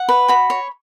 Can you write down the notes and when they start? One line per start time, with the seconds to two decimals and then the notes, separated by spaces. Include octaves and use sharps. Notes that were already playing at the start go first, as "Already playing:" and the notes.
Already playing: F#5
0.09 B4
0.28 F#4 B5
0.50 C#5